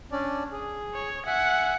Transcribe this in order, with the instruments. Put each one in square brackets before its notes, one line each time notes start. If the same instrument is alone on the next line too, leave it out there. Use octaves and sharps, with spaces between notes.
[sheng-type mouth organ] C#4 D4 D5
G#4
[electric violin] C#5
[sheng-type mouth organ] E5 G#5 [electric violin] F#5